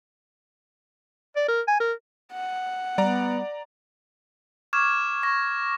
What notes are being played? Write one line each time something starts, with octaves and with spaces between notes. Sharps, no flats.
D5
A#4
G#5
A#4
F#5
G3 B3 D5 A#5
C#6 D6 F6 G#6 E7
C#6 A#6